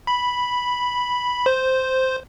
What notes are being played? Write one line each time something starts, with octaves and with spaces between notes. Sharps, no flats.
B5
C5